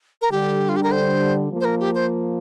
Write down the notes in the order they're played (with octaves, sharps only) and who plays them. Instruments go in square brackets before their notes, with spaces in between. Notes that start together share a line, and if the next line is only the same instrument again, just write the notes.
[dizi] A#4
[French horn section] D3 G3 [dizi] G4
[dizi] F4
G4
A#4
C5
[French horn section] F3 A#3
[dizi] C5
A#4
G4
C5